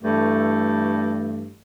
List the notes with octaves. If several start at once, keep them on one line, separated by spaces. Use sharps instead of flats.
G2 E3 A3